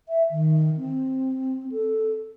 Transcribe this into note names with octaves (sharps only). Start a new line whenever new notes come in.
E5
D#3
C4
A4